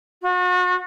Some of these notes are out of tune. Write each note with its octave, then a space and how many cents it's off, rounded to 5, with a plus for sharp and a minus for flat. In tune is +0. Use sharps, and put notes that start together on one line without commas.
F#4 -40